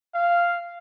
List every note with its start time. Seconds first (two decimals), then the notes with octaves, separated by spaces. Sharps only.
0.14 F5